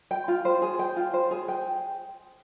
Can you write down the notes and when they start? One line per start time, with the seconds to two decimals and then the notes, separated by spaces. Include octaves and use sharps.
0.11 G5
0.28 F4
0.45 C5
0.62 G#4
0.79 G5
0.96 F4
1.14 C5
1.31 G#4
1.48 G5